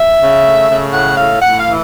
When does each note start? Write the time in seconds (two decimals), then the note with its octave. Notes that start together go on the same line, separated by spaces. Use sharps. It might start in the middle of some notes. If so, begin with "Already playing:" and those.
Already playing: E5
0.19 C#3
0.43 A3
0.69 C#3
0.93 A2 F#5
1.17 A2 F5
1.42 A2 F#5
1.59 F5
1.67 E3